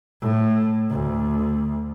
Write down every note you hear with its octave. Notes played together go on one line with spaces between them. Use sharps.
A2
D2